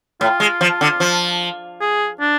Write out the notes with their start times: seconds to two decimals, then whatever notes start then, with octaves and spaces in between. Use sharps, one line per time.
0.21 A2 F4
0.40 G#3
0.61 F3
0.81 D3
1.00 F3
1.81 G#4
2.21 D4